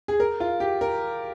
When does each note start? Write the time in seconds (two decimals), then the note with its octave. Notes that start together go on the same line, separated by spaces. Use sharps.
0.08 G#4
0.20 A#4
0.40 F4
0.60 G4
0.81 A#4